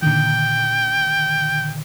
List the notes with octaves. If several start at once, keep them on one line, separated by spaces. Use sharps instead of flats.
A#2 D3 D#3 G5